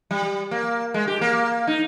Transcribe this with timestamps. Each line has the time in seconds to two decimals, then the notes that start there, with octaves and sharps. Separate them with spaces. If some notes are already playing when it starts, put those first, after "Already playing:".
0.11 G3
0.51 A#3
0.94 G#3
1.08 G4
1.21 A#3
1.67 D#4